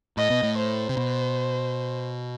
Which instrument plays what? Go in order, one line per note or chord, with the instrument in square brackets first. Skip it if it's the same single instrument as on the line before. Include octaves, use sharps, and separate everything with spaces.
[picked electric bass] A2 [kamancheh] D#5
[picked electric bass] B2
A2
[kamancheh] C5
[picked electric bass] C3
B2